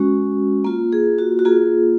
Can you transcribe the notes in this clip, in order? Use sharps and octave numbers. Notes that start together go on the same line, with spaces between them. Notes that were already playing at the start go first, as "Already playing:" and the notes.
Already playing: G#3 C#4 F#4
A#3 F4
G#4
F#4
F#4
A#3 F4 G#4